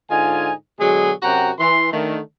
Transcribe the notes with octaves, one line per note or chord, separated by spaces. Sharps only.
G#2 D3 D#4 F4 G#5
B2 D3 F#3 G#3 G#4
F#2 C3 F#4 F#5 G5 A#5
E3 C6
D3 D#3 A3